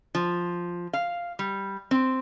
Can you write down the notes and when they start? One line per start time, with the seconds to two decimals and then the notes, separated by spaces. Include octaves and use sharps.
0.15 F3
0.93 F5
1.39 G3
1.91 C4